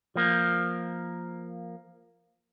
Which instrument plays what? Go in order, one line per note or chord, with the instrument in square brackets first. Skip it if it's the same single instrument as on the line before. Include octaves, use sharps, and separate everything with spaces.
[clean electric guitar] F3 A#3